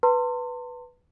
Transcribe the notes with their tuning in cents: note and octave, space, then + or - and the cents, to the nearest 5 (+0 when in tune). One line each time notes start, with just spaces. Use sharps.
B4 +0 A5 +45 C6 +0